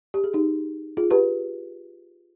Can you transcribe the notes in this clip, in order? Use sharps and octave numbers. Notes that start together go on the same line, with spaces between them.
G4
G#4
D#4 G4
F4 G#4
G4 B4